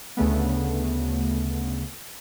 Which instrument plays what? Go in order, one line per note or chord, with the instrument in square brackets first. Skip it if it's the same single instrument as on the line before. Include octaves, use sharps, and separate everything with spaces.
[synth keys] D2 C#3 A3 B3